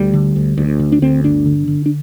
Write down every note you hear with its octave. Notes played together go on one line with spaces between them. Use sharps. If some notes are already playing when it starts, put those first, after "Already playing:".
Already playing: D2 G3
D3
D2
D2
D3
D4
D2 C4
G1 D4
D3
D3
D4